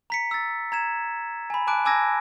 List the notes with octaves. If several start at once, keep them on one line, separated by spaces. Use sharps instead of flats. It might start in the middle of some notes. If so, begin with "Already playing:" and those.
A#5 B6 C#7
E6 A6
A#5 G#6 E7
G#5 B5
G#5 A5 D6 F#6 D7
G#5 A5 D6 E6 G#6 A#6